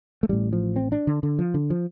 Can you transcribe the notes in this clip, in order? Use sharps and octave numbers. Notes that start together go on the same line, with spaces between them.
A3
A1 A2 G3
F3
C4
D4
D3
D3
F3
D3
F3